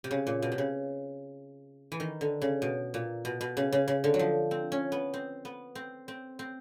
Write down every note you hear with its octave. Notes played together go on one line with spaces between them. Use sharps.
C3
C#3
A#2
B2
C3
C#3
E3
D#3
D3
C#3
B2
A#2
B2
B2
C#3
C#3
C#3
D3
F#3
F3
C4
C#4
B3
C4
B3
C4
C4
C4